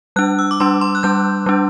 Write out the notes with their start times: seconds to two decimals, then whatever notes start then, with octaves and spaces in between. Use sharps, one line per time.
0.16 G3 D4 F#6
0.39 E6
0.51 D6
0.60 G3 D4 C6
0.81 C6
0.95 F#6
1.03 G3 D4 G6
1.46 G3 D4